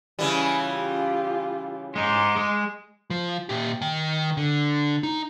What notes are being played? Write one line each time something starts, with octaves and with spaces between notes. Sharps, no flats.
C#3 E3 G3
F4 G4
G#3 D#4 C6 D6
G#3
F3
A#2 G4
D#3 G5
D3
D#4